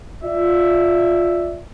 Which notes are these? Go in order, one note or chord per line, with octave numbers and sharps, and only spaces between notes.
F4 D5 E5